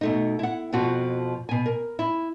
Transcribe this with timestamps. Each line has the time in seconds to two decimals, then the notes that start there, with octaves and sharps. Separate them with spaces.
0.01 B2 A3 D#4
0.39 E4 F#5
0.73 F2 B2 F3 F#4
1.49 B2 G#5
1.66 A#4
1.99 E4